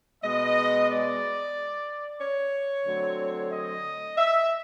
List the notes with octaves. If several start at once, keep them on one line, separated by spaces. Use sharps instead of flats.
B2 G#3 B3 D#5
D5
C#5
D3 F#3 A3 C4
D#5
E5